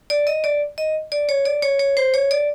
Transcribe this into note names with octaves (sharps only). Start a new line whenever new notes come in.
D5
D#5
D5
D#5
D5
C#5
D5
C#5
C#5
C5
C#5
D5